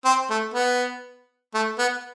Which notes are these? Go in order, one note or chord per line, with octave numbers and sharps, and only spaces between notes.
C4
A3
B3
A3
B3